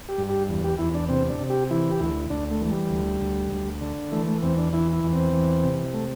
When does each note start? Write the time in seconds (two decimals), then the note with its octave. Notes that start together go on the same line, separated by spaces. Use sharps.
0.09 G4
0.18 G2
0.29 G4
0.49 E2
0.64 G4
0.79 E2 E4
0.94 D4
1.09 C3 C4
1.29 D4
1.39 C3
1.50 G4
1.71 E3 E4
1.91 G4
2.00 D2 E4
2.30 D2 D4
2.51 A3
2.61 E3 A3
2.70 G3
2.90 D2
3.21 D2
3.51 D2
3.81 D3
4.12 E3 A3
4.27 A3
4.43 E2 C4
4.58 D4
4.73 E3 E4
4.93 E4
5.04 E2
5.12 C4
5.33 E3
5.63 C3
5.93 A3